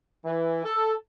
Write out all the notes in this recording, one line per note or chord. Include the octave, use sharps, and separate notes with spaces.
E3
A4